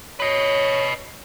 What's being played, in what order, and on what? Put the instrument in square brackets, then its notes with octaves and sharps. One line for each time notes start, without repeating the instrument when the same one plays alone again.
[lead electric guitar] B4 D#5 [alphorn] C#5